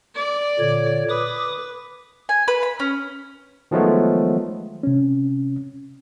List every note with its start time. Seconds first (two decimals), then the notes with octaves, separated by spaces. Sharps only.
0.15 D5
0.59 A#2 D3 C#5
1.10 B4 D6 D#6
2.29 G#5
2.48 B4
2.63 B5
2.80 C#4
3.71 D#3 F3 F#3 G#3 A3 B3
4.83 C3 C#4